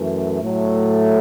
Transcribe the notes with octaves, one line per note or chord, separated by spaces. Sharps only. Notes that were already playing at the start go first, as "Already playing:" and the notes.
Already playing: F#2 E3 A3
A2 F#3 A3